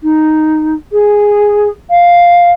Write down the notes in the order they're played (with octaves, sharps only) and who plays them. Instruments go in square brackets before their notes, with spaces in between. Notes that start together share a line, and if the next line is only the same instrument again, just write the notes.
[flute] D#4
G#4
F5